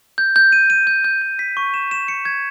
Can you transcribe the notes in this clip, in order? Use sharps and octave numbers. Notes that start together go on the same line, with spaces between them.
G6
G6
D#7
D#7
G6
G6
G6
B6
C#6
E7
E7
C#7
G#6